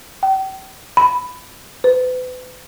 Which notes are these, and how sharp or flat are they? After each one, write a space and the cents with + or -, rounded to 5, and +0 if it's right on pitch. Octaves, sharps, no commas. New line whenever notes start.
G5 -40
B5 +10
B4 +40